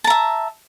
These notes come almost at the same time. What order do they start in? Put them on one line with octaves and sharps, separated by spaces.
A5 A#5 E5